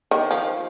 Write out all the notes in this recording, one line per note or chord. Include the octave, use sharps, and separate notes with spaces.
D#3
F3